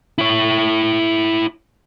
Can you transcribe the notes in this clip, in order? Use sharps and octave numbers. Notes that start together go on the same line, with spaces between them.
E4 C#5